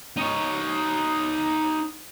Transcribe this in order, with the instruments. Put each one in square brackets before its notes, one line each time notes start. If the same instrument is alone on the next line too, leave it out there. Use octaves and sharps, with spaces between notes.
[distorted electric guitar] D#4 C#5